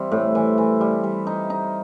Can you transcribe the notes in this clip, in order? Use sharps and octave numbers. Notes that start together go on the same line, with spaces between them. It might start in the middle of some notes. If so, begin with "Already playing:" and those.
Already playing: E3 G3 C4
A2
E3
E3
G3
G3
D#4
D#4